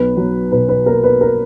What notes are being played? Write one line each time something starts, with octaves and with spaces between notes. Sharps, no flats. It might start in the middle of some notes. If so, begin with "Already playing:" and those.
Already playing: B1 B4
F#3
B2 B4
B4
A#3 A#4
B4
A#4